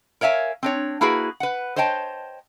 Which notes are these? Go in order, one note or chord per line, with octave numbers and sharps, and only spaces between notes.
A#4 C#5 E5 F5 G#5
C4 D4 C#5
A#3 E4 F#4 G#4 B4
B4 F#5
C5 C#5 D#5 G5 A5